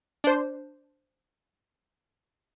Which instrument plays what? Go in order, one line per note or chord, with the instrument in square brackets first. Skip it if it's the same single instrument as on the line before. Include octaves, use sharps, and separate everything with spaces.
[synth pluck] D4 C5